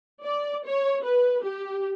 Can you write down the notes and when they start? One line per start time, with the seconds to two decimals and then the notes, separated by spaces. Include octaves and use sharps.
0.23 D5
0.66 C#5
1.03 B4
1.43 G4